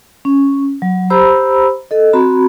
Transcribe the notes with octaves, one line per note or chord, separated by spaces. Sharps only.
C#4
F#3
G4 C5 A#5 B5 E6
A4 D#5
C4 F#4 A#5 B5